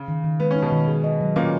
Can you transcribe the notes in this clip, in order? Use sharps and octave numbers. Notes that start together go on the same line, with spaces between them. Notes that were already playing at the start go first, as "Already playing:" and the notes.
Already playing: C#3
D#3
D#3
G#3 B3
C#4 D#4
B2 B3
D#3
G#4
D#5
F#3
A#2 A#3 C#4